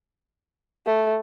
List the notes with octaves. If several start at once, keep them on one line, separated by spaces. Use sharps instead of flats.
A3